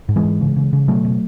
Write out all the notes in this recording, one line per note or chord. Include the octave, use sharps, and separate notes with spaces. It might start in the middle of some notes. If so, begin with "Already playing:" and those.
G#2
E3 G#3
G#2
C#3
C#3
C#3
B2 F#3 A3
B2